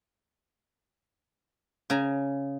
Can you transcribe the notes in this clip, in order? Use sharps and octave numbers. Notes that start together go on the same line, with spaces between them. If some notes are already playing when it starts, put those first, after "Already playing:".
C#3 G#5 A#5